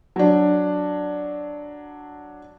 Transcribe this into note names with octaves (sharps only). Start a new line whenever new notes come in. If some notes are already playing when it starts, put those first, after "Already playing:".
F#3 D4